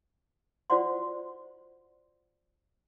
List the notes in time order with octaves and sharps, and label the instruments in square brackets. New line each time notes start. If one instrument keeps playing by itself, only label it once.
[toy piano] F4 F#4 C5 D5 F#5 C6